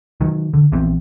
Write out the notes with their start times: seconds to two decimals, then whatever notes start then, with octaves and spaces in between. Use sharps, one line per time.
0.21 D#3 F#3
0.54 D3
0.72 A#1 E3 B3 C4